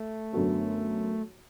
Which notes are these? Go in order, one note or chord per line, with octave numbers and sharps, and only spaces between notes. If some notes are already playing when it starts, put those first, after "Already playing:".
Already playing: A3
F#2 D3 B3 F#4 A4